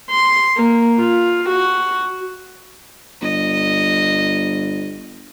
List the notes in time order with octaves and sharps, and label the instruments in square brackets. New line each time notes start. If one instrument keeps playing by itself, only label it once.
[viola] C6
A#3
F4
F#4
[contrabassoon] G1 [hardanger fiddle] D#5